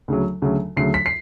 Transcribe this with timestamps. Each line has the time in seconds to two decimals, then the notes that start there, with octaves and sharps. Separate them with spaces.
0.08 D2 C#3 F#3
0.42 D2 C#3 F#3
0.77 D2 C#3 F#3 C7
0.94 B6
1.06 C7